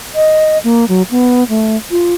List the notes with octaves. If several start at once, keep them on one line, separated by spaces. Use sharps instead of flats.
D#5
A#3
F#3
B3
A3
F4